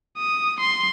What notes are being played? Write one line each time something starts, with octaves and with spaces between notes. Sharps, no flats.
D#6
C6